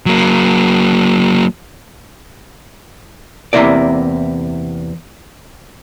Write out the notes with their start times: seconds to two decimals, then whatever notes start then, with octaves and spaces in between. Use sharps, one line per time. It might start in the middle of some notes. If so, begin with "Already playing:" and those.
0.06 F#3 A#3
3.53 E2 C3 A#3 E4 A#4 D5